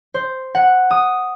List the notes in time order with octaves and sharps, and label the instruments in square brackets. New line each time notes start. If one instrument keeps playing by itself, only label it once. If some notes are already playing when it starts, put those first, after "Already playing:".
[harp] C5
F#5
D#6